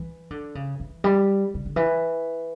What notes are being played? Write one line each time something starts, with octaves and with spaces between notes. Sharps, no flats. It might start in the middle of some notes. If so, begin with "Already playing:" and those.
Already playing: E3
D3
C#3
E3
G3
C#3
D3
E3